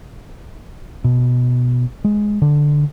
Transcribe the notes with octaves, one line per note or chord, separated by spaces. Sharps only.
B2
G#3
D3